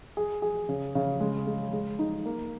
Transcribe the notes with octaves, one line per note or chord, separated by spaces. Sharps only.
G#4
G#4
C#3
C#3
G#3
G#3
G#3
D#4
A#3